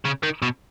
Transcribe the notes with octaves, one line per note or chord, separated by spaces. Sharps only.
C#3
D#3
B2